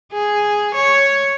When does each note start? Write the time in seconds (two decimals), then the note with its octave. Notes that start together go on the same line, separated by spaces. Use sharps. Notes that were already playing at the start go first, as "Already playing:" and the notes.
0.13 G#4
0.75 C#5